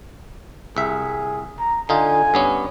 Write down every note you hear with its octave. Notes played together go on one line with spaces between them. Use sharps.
C2 G#4 E5
A#5
D3 D#4 F4 G#5
G2 B3 C#4